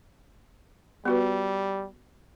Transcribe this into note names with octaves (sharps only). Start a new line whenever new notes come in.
G3 B3 F#4 B4